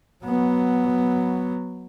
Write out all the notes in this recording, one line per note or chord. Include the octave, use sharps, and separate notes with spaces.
F#3 B3